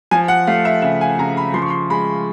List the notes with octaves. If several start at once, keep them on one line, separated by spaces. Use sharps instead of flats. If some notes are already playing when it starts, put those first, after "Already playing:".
F3 G#5
F#5
A3 F5
E5
C#3 E5
G#5
C#3 A#5
B5
F3 C6
C#6
C6
G#3 B5